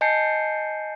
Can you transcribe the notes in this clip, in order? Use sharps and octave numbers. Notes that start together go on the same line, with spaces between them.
D#5 G#5 A5 G6 C7 C#7